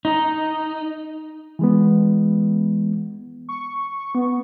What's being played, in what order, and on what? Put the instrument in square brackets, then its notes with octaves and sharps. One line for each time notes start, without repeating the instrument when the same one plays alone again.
[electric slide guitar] D#4
[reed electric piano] E3 G#3 B3
[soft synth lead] C#6
B3